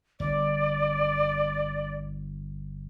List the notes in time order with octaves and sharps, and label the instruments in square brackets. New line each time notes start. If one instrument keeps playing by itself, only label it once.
[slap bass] G1 [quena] D5